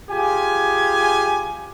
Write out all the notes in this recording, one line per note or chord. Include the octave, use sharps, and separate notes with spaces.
F4 G4 G#4 G#5